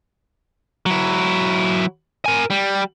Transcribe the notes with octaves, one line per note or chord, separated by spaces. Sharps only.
F#3 E4
A#4 G#5
G3